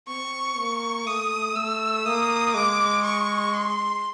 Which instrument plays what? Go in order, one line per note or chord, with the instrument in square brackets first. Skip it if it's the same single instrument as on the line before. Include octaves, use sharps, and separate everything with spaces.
[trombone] C4 [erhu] C#6
[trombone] A#3
[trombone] A3 [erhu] D#6
[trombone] A3 [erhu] E6
[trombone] A#3 [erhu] D#6
[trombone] G#3 [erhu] D6
[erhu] C#6
C6